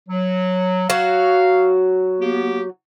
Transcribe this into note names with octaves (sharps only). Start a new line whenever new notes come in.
F#3
F#3 F#4 F5
A#3 B3 G4